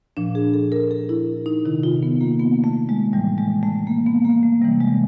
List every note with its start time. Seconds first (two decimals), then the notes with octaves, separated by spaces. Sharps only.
0.17 A#2 F3 D4
0.35 G#4
0.54 A4
0.72 A#4
0.91 A4
1.09 E4
1.46 D#4
1.65 C3 D#3 E4
1.83 F4
2.03 B3
2.21 A#3
2.40 B3
2.64 A3
2.89 G#3
3.13 A2 E3 G3
3.38 G#3
3.63 A3
3.87 A#3
4.06 B3
4.25 A#3
4.43 A3
4.62 C3 E3 G3
4.80 G#3